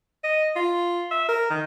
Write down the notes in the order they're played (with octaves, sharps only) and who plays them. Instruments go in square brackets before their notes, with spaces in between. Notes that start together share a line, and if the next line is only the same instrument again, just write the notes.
[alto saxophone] D#5
F4
E5
A#4
D#3